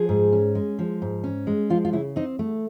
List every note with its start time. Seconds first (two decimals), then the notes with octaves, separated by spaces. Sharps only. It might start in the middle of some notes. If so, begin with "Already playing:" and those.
Already playing: F3 G#4
0.09 G#2
0.32 C#4
0.55 G#3
0.79 F3
1.02 G#2
1.24 C#4
1.47 G#3
1.70 F3 F4
1.85 F4
1.93 C#3 E4
2.16 C4 D#4
2.39 A3